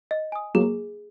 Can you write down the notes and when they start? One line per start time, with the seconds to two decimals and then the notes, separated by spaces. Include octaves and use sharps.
0.11 D#5
0.32 G#5 D#6
0.54 F#3 A#3 G#4